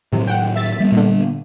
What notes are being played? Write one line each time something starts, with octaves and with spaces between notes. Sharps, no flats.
A2 C3 D#3 F#3
F#5 G5
E5 A6 B6
G3 A3 B3
A#2 D3